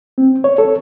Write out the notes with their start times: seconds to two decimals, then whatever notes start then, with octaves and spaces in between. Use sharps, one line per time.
0.18 C4
0.44 C#5
0.58 A4